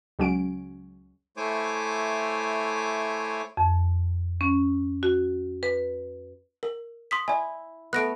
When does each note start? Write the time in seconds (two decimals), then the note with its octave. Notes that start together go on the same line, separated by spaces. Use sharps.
0.19 C#2 F#3 C#4 D7
1.37 A3 E4 C5 C#5 G#5 D6
3.57 F2
4.41 C#4
5.03 F#4
5.63 B4
6.63 A#4
7.11 C6 D#6 B6
7.28 E4 D5 G#5
7.93 A3 B3 F#6 A#6 D7